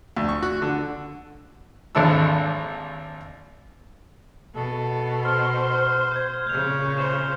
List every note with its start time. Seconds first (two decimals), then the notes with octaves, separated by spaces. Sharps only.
0.16 D2
0.29 C#6
0.43 F#4
0.62 D3
1.95 G#1 D#2 D4 A4 E6
4.55 B2 A4
5.25 C5 F6
6.12 G6 G#6
6.47 A#2 C#3 G6 F7
6.98 C5 E7